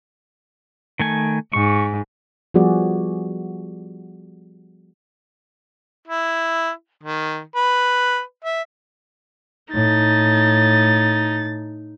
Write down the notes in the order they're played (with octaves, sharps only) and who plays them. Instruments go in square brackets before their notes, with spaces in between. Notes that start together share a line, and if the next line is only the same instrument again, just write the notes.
[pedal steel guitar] D#3 A3 G#5
[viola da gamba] G#2 [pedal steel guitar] C#6
[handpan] F3 G3 B3 F#4 G#4 D5
[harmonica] E4
D#3
B4
E5
[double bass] A2 [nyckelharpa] D#4 [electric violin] A6